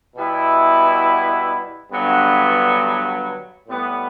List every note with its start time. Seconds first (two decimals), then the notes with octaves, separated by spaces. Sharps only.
0.16 B2 G3 B3 E4
1.91 G2 D3 F#3 B3
3.67 A2 G3 B3